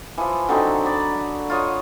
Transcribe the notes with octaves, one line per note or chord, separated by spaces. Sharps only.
E3 F3
D3 F#3 C4 D#4
D5 A#5 B5
F4 C#5 D#5 F#5